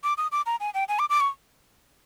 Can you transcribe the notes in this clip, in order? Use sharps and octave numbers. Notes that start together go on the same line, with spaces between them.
D6
D#6
D6
A#5
G#5
G5
G#5
D6
D6
C#6